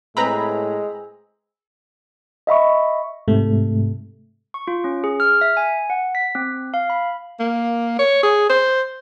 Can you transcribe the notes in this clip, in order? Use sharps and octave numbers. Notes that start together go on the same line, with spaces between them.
A2 G#3 C4 G#4 B4 A#5 B5
D#5 E5 B5 C#6
G#2 C3 A3
C#6
F4
C#4
G#4
F6
E5
G#5
F#5
B6
C4
F5
B5
A#3
C#5
G#4
C5